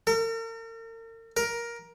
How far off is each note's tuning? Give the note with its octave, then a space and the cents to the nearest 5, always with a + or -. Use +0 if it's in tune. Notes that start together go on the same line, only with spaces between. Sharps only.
A#4 -45
A#4 +10